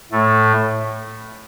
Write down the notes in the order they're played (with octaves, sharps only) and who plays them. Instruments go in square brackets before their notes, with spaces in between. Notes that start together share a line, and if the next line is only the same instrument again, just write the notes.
[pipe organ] A2 A3